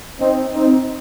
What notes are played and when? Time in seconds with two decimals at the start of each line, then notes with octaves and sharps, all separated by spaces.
0.20 C4 D#4
0.54 C4 D#4